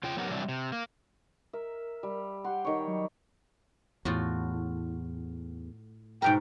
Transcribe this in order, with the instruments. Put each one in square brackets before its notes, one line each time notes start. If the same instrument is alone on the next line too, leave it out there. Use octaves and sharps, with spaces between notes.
[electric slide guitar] C#3 F4 G5
F#3 B3 D#4 G4 A#4 F#5
C3 E3 F#3 G3 D4
C3
A#3
[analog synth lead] A#4 [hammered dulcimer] E5
[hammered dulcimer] G3
[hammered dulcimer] G4 C6 [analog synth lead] F#5
[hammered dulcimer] D#3 C#5
[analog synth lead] F#3
[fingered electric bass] E2 [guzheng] A2 F4 F#4
[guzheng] G#2 B2 A#4 [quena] G5